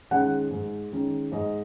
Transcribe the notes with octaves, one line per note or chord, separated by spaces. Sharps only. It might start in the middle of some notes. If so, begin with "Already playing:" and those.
D#3 G#3 C#4 F#5
G#2
D#3 G#3 C#4
G#2 D#5